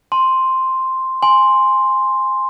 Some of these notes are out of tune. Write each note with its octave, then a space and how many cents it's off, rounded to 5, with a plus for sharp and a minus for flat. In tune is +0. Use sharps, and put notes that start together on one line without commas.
A5 +0 C6 +0
G#5 +0 C6 +0